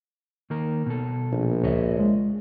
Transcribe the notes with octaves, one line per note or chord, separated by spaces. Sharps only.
D#3 A#3 A#4
B2 A4
A#1
C#2 C#5 D#5 E5
G#3